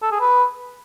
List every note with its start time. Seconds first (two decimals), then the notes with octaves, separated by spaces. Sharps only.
0.02 A4
0.11 G#4
0.20 B4